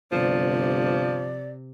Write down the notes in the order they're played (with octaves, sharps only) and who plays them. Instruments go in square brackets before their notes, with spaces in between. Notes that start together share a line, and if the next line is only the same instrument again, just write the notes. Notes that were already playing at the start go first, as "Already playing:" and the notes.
[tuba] G1 [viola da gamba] C3 [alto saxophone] F3 [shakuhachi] D5